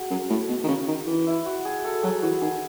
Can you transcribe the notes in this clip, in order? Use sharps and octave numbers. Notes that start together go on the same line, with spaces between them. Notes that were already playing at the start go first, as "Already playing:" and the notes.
Already playing: F#4 G#4
F#2
A2
B2
D#3
C#3
D#3
E3
E4
F#4
G#4
A4
F#3 G#4
E3 F#4
D#3 G#4